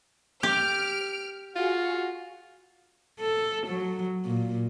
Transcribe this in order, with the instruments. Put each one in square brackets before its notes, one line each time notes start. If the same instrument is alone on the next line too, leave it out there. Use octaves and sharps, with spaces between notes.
[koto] G4 [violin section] F6 D7
[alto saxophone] F4 [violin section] F#4 G#4
[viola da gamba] A4
F#3
A#2